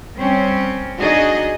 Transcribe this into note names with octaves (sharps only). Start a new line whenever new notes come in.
G3 C4 C#4
D4 D#4 F#4 G#4 D#5